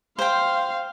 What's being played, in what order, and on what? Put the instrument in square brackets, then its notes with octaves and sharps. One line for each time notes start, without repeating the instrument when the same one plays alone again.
[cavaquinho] C5 G5 [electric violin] F5 C6